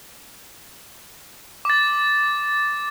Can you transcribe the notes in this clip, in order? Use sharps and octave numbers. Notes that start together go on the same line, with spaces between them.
D6 A6